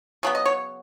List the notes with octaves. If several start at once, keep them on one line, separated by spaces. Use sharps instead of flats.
C#3 F#3 B3
D#5
C#5